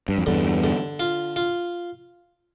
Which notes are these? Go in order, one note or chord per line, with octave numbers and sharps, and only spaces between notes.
G2
F2
E2 G2 D3
D3
F4
F4